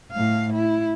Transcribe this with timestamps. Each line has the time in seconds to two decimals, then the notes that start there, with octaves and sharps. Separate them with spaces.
0.12 A2 F5
0.53 E4